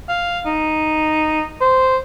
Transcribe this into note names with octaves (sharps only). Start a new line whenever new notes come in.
F5
D#4
C5